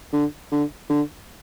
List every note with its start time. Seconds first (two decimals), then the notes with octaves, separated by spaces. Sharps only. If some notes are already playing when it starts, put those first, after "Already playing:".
0.13 D3
0.52 D3
0.90 D3